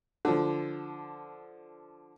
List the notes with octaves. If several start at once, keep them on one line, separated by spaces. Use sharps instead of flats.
D3 F3